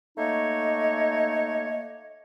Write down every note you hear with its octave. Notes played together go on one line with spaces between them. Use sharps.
A3 A#3 D#4 C#5 D#5